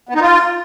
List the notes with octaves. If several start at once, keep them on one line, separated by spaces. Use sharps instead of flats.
B3
D#4
F4